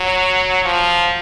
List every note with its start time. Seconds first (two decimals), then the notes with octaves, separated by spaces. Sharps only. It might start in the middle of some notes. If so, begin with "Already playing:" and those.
Already playing: F#3
0.65 F3